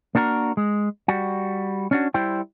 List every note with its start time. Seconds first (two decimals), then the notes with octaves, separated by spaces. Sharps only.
0.15 A#3 D4 F#4 A4 A#4
0.57 G#3
1.08 G3 F#4
1.91 C#4 D4 F#4
2.14 G3 E4 C5 G5